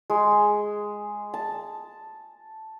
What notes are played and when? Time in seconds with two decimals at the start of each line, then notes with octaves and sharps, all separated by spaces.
0.10 G#3
1.34 A5